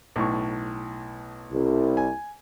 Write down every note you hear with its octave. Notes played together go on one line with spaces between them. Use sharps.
B1 A2 C#6
C2
G#5